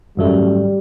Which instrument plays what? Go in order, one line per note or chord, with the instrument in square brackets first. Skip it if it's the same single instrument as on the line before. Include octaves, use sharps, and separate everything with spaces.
[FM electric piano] G#1 F#2 A3 [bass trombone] G3